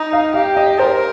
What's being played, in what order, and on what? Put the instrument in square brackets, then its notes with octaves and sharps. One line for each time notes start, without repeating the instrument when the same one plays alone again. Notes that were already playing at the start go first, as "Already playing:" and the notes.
Already playing: [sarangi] D#4
[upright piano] F5
[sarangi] G4 [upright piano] F5
[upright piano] D#5
[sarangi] A#4 [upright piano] C5